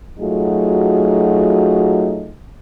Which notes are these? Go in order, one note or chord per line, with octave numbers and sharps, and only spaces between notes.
F#3 A3 D#4 F4 F#4 G#4